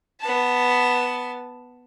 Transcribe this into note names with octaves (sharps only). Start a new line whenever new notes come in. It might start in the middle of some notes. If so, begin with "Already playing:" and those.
B3 A5